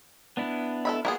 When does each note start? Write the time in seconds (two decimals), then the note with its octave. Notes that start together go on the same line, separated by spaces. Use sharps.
0.37 B3 D4 E4
0.85 A4 E5 B5
1.05 A#3 B3 E4 F4 G#4